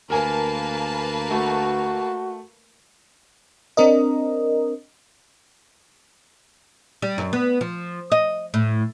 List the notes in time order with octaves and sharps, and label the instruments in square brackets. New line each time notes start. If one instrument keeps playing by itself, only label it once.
[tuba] D2 [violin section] A#3 B4 A5 [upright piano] A#4 G#5
[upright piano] A3 [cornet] F#4
[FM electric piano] C4 D4 A#4 D#5
[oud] G3
F#2
B3
F3
D#5
A2